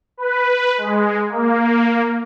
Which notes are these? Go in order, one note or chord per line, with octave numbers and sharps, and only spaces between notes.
B4
G#3
A#3